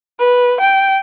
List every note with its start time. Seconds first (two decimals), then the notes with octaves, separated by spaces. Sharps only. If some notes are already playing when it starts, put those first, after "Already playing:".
0.19 B4
0.61 G5